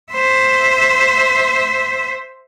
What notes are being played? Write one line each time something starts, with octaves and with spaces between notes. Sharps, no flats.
C5 E5